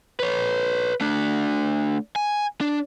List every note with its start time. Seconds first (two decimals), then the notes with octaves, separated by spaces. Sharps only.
0.20 B4 C#5
1.01 A3 D4
2.16 G#5
2.61 D4